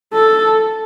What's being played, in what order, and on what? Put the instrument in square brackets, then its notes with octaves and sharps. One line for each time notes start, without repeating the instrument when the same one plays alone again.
[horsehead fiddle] A4